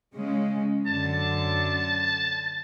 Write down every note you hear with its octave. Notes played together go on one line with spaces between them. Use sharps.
C#3 G#3 C#4
F#2 D3 A5